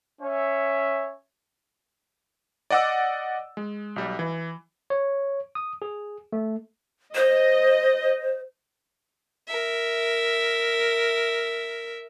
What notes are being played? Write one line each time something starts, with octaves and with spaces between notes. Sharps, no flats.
C#4 C#5 E5
D5 D#5 F#5 D6 E6
G#3
B1 G3
E3
C#5
D#6
G#4
A3
C5 D#5
A#4 E5